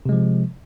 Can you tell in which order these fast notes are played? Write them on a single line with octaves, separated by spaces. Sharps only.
C3 G#3 F3